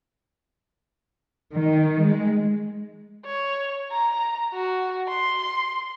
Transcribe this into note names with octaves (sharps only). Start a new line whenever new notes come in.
D#3
G#3
C#5
A#5
F#4
C6